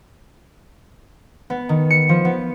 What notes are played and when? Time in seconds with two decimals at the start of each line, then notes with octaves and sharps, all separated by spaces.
1.50 B3
1.69 D#3
1.90 C#7
2.09 F3
2.25 B3